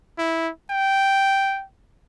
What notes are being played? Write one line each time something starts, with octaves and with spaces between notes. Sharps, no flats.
E4
G5